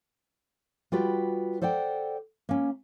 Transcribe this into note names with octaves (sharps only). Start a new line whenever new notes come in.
G3 F4 F#4 B4 G5
A4 C5 D5 F#5 G5
A#3 C#4